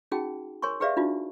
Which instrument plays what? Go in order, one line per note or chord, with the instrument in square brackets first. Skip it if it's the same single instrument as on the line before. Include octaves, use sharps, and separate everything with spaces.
[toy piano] C#4 D#4 F#4 G#4 G5
A#4 C#5 G#5 C6 C#6
G4 G#4 B4 D5 E5 F5
D4 D#4 F4 F#4